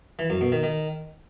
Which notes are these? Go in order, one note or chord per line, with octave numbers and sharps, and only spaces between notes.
E3
F#2
B2
D#3
D#3